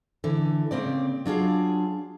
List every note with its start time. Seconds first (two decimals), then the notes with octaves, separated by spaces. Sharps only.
0.24 D3 E3
0.71 C#3 A#3 C4 D5
1.26 F#3 D4 F4 G#4